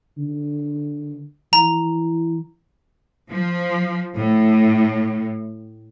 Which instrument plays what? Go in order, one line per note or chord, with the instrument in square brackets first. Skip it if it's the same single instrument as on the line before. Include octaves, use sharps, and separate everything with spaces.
[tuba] D3
[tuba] E3 [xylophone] A#5
[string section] F3
A2